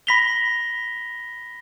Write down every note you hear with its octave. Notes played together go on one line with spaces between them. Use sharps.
B5 A#6 B6 F7 G7